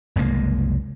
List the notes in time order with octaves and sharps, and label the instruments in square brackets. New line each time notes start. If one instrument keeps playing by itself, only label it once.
[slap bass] F#1 C2 G#3 A#3